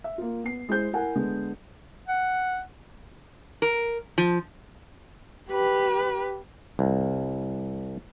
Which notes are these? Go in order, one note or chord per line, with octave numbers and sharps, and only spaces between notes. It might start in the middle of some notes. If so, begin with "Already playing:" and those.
E5
A#3 F4
B3 C7
G#3 E4 G#4 C5 G6
E4 A#4 F#5 G#5
D3 G#3 B3
F#5
A#4
F3
G4 B4
C2